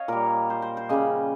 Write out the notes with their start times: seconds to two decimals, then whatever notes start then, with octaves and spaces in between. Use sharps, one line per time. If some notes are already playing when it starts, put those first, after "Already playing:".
Already playing: C#5 D#5 F5
0.08 A#2 G3 A#4
0.50 C5
0.62 C5
0.77 C5
0.89 C#3 G3 D#5